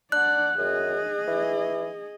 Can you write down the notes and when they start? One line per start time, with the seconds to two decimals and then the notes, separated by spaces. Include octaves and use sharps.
0.12 D4 D5 F#5 F#6
0.59 F#2 G#4 D#5
1.27 E3